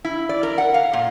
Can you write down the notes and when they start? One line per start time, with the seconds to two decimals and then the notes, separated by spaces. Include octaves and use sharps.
0.05 E4
0.29 D5
0.43 A#4
0.58 F#5
0.74 F5
0.93 A#2